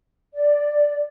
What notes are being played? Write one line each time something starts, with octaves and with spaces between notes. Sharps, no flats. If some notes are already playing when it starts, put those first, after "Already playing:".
D5